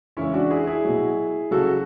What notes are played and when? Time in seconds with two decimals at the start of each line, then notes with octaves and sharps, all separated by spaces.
0.17 C#3 E3 G#3 C#4 E4
0.34 D4 F#4
0.51 E4 G#4
0.67 E4 G#4
0.84 B2 F#3
1.51 C#3 F#3 F#4 A4